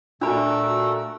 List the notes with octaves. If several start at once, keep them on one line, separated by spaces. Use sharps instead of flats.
A#2 A3 D4 F#4 A#4 A5 B5 E6